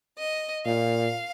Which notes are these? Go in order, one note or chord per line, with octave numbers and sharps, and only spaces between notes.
D#5
A#2 F5